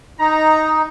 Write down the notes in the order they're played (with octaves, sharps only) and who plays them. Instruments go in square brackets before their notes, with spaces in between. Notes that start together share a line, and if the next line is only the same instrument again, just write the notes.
[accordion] D#4 [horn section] A#5